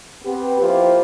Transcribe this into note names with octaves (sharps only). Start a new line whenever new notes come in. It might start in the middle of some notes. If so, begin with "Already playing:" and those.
B3 C4 G4
F3 A#3 E4 F4 G4 C5